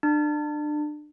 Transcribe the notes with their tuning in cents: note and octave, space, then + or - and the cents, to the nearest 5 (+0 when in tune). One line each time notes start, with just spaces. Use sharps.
D4 +30